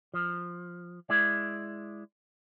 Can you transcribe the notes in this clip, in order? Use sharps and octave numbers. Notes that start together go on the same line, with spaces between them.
F3
G#3 E4 D5